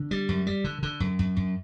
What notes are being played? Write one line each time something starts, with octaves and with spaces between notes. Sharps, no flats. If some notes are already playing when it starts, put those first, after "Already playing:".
Already playing: D3
G3
F#2
G3
D3
D3
F#2
F#2
F#2